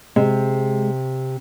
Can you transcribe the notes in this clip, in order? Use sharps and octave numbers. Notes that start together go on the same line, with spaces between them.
C3 G#3